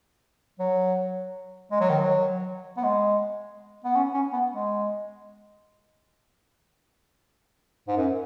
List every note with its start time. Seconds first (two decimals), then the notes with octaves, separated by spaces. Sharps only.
0.59 F#3
1.71 G#3
1.80 F#3
1.90 D#3
1.99 F#3
2.77 B3
2.83 G#3
3.85 B3
3.96 C#4
4.14 C#4
4.33 B3
4.52 G#3
7.88 G#2
7.97 F#2